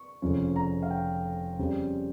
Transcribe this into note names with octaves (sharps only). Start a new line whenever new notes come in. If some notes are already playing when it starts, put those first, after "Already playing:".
Already playing: C#6
F1 F2 C#3 F3 C#4
A#5
F5
G5
F2 C#3 G3 C#4